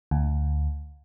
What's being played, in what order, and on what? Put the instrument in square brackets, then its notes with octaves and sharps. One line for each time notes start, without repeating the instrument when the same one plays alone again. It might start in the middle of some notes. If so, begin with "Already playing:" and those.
[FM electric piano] D2